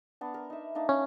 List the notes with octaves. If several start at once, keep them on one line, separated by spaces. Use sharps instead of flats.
B3 D4
A#4
D#4 E5
A#3 D4 D#4
C#4